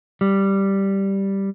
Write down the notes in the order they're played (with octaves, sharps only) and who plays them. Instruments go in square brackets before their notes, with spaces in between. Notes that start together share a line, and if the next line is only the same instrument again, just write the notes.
[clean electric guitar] G3